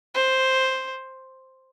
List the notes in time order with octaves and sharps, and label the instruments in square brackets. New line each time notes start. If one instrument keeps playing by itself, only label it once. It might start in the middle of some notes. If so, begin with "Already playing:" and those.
[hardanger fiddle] C5